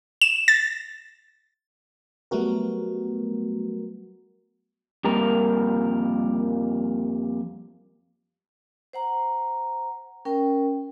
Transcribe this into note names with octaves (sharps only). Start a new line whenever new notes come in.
E7
A6
F#3 G3 A3 B3 F#4 A#4
F2 G3 A#3 A#4
C5 F#5 A#5
C#4 A#4 G5